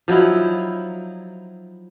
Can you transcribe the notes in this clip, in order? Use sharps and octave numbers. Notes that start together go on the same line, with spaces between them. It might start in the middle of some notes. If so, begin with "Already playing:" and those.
F3 F#3 D#4 E4